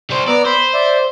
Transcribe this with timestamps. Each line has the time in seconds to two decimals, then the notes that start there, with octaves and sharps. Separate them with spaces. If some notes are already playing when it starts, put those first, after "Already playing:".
0.10 G3 C5
0.28 B3 D5 A#5 E6
0.46 C5 B5
0.74 D5 E5